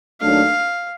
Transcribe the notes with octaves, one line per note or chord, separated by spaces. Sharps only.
D#2 D#3 F#3 A3 D4 F5